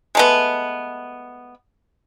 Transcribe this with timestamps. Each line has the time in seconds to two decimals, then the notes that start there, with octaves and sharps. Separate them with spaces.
0.15 G#3 A3 B3